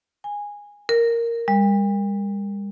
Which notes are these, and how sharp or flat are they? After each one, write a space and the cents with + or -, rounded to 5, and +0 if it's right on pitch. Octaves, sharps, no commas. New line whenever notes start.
G#5 -15
A#4 -5
G3 +40